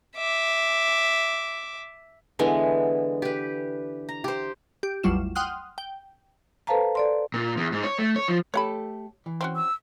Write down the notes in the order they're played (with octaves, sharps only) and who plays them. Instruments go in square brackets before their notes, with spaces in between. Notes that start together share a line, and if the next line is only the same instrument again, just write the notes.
[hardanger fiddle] E5 D6
[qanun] D3 E3 G#3 B3
G4 B4
A#5
G4 C5
[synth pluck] G4
A1 E2 F#3 G3 F4 E7
F#5 G5 C6 D#6 F6 F#6
G5
[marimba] A4 B4 C5 F5 A5 A#5
A4 D5 C6
[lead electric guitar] A#2
E2
G#2
C#5
A3
C#5
F3
[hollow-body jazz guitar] A3 G4 A4 [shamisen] C#5 F#5 B5
[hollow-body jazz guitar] E3
[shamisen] C4 C#4 F#4
[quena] E6